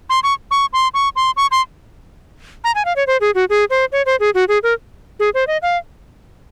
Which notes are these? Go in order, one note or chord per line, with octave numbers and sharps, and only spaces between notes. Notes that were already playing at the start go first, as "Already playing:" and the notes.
C6
C#6
C#6
C6
C#6
C6
C#6
C6
A#5
G#5
F5
C#5
C5
G#4
F#4
G#4
C5
C#5
C5
G#4
F#4
G#4
A#4
G#4
C5
D#5
F5